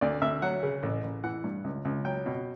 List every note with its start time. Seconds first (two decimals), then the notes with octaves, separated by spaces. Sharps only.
0.01 D2 D5
0.22 D2 E5
0.42 F#3 F#5
0.63 C#3
0.83 A1
1.04 A1
1.24 E3 F#5
1.44 G2
1.64 C#2
1.85 C#2
2.05 F#3 G5
2.26 B2